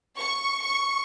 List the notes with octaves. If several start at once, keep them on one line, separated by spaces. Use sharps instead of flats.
C#6
C#6